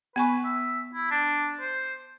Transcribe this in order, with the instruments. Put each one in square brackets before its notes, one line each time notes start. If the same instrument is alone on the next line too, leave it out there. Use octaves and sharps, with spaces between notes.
[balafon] B3 G#5 C#6 [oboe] B4
[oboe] E5
E4
D4
C5